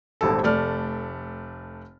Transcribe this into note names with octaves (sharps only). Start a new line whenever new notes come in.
D#1 G#1 D#2 A4
F1 A3 D5 F6